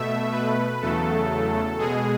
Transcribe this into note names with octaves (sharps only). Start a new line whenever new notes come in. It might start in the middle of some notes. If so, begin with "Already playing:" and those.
Already playing: B2 A3 E5
B4
E2 C#3 F#3 A3 A4
B2 G#3 G#4